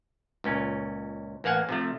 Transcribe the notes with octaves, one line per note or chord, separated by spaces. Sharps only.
C#2 A#2 C#4
A1 A#3 F5 F#5 G#5
C3 F3 A3